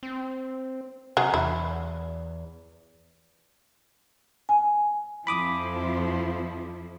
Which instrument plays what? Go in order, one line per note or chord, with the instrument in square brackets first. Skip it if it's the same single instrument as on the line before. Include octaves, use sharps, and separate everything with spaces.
[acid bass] C4
[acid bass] C3 [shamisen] F#3 G#4
[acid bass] E2 [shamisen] E4
[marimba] G#5
[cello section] F2 F3 E4 [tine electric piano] B5 D6 D#6